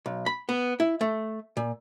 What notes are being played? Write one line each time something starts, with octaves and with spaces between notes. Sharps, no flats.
B1
B5
B3
E4
A3
A#2